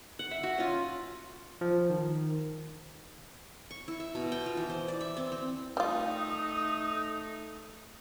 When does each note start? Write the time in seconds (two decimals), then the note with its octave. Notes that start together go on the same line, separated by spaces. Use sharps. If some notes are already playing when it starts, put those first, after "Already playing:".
0.19 F#5
0.31 E5
0.43 F#4
0.58 C#4 F4
1.61 F3
1.90 D#3
3.71 C#6
3.88 E4
4.00 E5
4.15 B2
4.32 G5
4.46 F4
4.57 E3
4.69 C5
4.88 D5
5.01 E5
5.17 C4
5.32 C4
5.77 G3 A3 D#4 F4 D#6